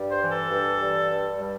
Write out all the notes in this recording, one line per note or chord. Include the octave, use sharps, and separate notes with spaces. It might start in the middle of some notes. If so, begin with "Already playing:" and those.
Already playing: G2 G3
C5
E3
A4
G2
G3
G2
G3